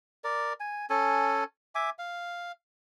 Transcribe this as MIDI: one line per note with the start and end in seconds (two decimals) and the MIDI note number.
0.24 0.53 70
0.24 0.53 74
0.60 0.86 80
0.90 1.44 61
0.90 1.44 69
0.90 1.44 80
1.75 1.90 76
1.75 1.90 80
1.75 1.90 86
1.99 2.52 77